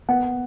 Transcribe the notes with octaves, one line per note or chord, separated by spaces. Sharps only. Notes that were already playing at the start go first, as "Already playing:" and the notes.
B3 F#5